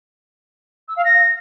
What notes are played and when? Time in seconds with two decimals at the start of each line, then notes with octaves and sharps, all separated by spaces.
0.88 E6
0.97 F5
1.05 A#6